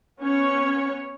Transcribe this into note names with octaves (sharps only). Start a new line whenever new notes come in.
B3 C#4 C#5